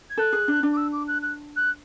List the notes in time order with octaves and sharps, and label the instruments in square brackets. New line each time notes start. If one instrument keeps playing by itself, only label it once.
[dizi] G#6
[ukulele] A4 [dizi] F#6
[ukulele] G#4
D4
D4
[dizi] D6
E6
D6
F#6
F#6
F#6